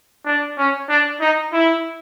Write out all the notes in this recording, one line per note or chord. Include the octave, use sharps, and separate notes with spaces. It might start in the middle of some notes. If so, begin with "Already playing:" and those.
D4
C#4
D4
D#4
E4